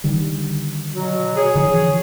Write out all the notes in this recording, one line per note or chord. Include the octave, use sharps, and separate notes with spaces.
D3 D#3 G3
B2 F#3 F#4
G#4 C#5
D3 E3 F3